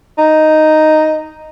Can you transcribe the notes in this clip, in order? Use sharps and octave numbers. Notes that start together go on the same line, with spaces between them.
D#4